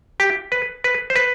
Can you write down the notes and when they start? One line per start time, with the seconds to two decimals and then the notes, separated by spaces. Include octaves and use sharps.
0.20 G4
0.52 B4
0.84 B4
1.10 C5
1.16 B4